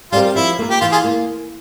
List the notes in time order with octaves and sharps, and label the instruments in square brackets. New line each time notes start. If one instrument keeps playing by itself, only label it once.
[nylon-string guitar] G3 C4 G4 A#4 [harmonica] F4
[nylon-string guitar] F3 [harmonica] E4
[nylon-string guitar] A#3 F4 A#4
[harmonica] G4
[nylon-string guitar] E3 [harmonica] F4
[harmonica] F4 G#4
[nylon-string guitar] A#3